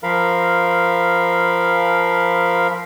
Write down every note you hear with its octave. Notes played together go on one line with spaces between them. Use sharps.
F3 A#4 F5 B5